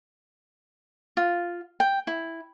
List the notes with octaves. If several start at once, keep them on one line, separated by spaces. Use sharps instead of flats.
F4
G5
E4